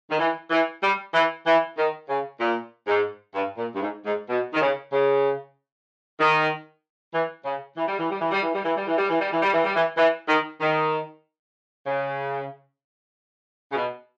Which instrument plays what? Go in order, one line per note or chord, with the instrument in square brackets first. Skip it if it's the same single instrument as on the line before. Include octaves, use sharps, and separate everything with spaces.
[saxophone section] D#3
E3
E3
G3
E3
E3
D#3
C#3
A#2
G#2
G2
A#2
G2
G#2
G#2
B2
D#3
C#3
C#3
D#3
E3
C#3
E3
G3
E3
G3
E3
G3
E3
G3
E3
G3
E3
G3
E3
G3
E3
G3
E3
G3
E3
E3
D#3
D#3
C#3
C#3
B2